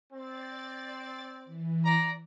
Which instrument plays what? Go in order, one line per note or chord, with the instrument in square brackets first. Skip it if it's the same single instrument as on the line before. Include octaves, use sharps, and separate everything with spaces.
[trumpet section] C4 [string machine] D5 A6
[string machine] E3
[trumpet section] D5 A#5